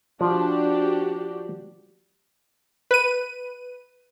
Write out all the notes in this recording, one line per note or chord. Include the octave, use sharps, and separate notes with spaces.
F3 D4 F#4 G4
B4 D#7